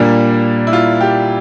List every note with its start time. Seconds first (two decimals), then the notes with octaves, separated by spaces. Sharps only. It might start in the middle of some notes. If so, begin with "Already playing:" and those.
Already playing: A#2 G3 A#3 D4
0.67 E4
0.73 F4
1.01 G4